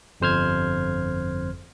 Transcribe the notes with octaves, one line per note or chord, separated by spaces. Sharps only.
G1 F2 C5 F6 G#6